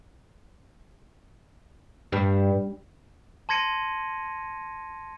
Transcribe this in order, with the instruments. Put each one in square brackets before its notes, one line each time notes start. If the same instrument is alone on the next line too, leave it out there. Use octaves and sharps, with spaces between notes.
[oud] G2
[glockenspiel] A5 C6 G#6 A#6 C#7 D#7